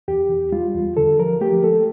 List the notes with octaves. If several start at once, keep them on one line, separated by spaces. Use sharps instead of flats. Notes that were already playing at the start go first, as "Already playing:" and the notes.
E2 G4
E2
G3 F4
E2
D3 A4
F3 A#4
A3 G4
A3 A4